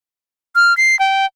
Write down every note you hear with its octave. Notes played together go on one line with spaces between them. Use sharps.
F6
C7
G5